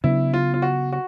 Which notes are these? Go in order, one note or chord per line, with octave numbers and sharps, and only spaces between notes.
C#3 F#3 B3 D4 E4
F4
F4
F#4
F#4